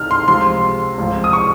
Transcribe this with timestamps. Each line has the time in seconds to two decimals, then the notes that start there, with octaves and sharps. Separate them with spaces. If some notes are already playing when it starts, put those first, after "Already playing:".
Already playing: C#2 C3 D#3 F6
0.11 C6
0.28 C#2 C3 F3 C6
0.98 C#2 C3 F3
1.24 D#6
1.33 C#6